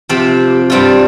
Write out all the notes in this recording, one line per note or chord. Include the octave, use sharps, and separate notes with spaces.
C3 F3 C4 G4
G2 G3 C4 F4